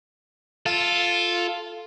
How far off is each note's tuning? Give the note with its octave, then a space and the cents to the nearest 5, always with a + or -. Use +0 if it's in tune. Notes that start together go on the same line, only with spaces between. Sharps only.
F4 +0 A4 +0